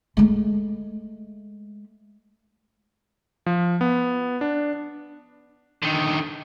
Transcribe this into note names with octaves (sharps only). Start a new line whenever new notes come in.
G#3 A3
F3
B3
D4
D3 D#3